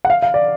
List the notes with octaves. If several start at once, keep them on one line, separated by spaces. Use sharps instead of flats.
F#5
F5
F5
D5